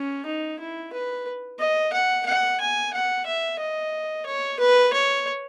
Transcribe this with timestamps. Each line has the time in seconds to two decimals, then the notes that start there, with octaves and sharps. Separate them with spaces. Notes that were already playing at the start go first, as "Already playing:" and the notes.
Already playing: C#4
0.26 D#4
0.59 E4
0.93 B4
1.60 D#5
1.93 F#5
2.26 F#5
2.60 G#5
2.93 F#5
3.26 E5
3.60 D#5
4.26 C#5
4.60 B4
4.93 C#5